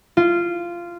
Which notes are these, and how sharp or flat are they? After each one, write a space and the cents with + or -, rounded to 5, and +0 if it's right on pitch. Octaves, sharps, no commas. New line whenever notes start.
F4 -15